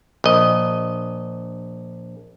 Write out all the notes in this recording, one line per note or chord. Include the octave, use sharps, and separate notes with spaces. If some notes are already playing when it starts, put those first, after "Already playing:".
A#1 D#5